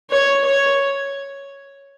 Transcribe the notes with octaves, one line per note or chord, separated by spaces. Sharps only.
C#5
C#5